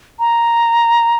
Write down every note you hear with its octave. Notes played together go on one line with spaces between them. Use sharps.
A#5